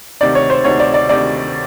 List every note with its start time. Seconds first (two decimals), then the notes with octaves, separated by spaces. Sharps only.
0.21 D2 C3 D#3 D5
0.35 C#5
0.50 C5
0.64 D2 C3 D#3 C#5
0.80 D5
0.94 D5
1.09 D2 C3 D#3 D5